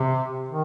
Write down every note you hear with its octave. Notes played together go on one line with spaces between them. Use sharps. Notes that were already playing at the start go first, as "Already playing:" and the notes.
Already playing: C3
D#3